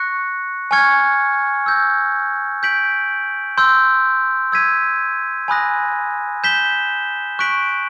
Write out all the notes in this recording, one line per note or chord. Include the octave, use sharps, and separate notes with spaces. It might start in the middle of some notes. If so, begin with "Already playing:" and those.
Already playing: C#6 F#6 A#6 C#7
G#5 C#6 F6 G#6 C#7
E6 G6 A#6
G6 B6 D7 F#7
C6 E6 G6
E6 G#6 B6 D#7
G#5 B5 D#6 F#6 A#6
G6 B6 E7 G7
C#6 F#6 B6 D7 F#7